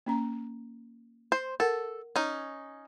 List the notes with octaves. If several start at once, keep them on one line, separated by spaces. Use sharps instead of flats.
A#3 C#4 A#5
C5
A4 A#4 F#5
C#4 D#4